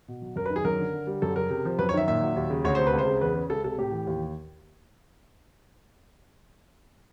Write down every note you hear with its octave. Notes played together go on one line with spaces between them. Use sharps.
B2
F#3
F#2 A#4
B4
D#3
G#4
F#2 A#4
D3
D3
G3
F#2 A4
C#3 A#4
C3
F3
F#2 B4
C#5
D#3 E5
A#2 E5
F#3
D#2
C#3
D2 C#5
C3 C5
B4
C#2
C5
C#3
E2 B4
C#3
C#2 A4
C3 A4
A2 G4
E3
D#2